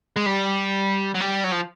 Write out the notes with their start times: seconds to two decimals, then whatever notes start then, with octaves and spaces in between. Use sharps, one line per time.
0.16 G#3
0.26 G3
1.15 F#3
1.21 G3
1.44 F#3
1.52 F3